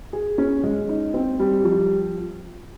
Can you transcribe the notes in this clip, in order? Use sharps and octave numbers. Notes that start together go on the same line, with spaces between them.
G#4
C#4
G#3
D#4
C4
G3
F3